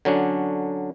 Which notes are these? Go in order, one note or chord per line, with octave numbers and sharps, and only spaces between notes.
D3 F#3 C#4 D4